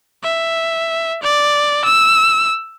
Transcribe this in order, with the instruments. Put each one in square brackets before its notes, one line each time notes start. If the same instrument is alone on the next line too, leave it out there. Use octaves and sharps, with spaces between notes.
[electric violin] E5
D5
E6